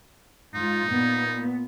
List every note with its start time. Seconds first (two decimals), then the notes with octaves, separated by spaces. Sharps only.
0.55 G#2 D#4 F4
0.88 A#2 B3